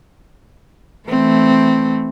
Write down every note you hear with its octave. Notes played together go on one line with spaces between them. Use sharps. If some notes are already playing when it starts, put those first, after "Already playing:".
E3 A3 C4